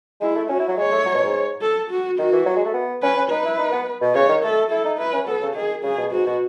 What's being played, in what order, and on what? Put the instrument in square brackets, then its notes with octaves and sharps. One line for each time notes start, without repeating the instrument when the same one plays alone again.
[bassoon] G#3 [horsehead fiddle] E4
[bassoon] A3
[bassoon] C#4 [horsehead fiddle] F#4
[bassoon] E4
F#3
[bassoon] G#3 [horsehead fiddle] C#5
[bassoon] A3
F#3
B2
G#2
[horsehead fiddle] A4
F#4
[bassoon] D#3 [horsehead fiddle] F#4
[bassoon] E3
F#3
G#3
A3
B3
[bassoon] C#4 [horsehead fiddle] B4
[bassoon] C#4
[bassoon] D#4 [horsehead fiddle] B4
[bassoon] E4
D#4
B3
B2
[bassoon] C#3 [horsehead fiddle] C#5
[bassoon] D#3
[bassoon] A3 [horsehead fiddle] A4
[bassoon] E4 [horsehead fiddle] A4
[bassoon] D#4
[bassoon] E4 [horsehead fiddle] B4
[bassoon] C#4
[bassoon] B3 [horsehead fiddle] A4
[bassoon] C#3
[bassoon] D#3 [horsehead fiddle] G#4
[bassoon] C#3 [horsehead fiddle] G#4
[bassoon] B2
[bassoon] G#2 [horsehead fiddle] F#4
[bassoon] B2